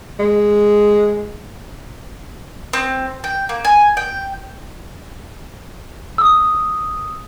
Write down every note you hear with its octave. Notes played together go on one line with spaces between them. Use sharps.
G#3
C4
G5
A#3
G#5
G5
D#6 E6